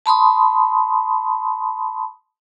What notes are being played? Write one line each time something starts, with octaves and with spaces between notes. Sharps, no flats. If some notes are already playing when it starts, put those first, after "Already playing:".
A5 B5 C6 D#6